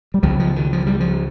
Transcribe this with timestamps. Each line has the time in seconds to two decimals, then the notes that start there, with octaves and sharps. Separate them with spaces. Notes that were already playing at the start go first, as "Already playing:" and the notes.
0.14 G3
0.23 C#2 C#3 F3
0.40 F3
0.56 D#3
0.73 F3
0.87 G3
1.00 F3